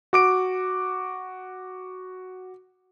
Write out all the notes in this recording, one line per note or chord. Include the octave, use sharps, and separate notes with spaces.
F#4 D6 D7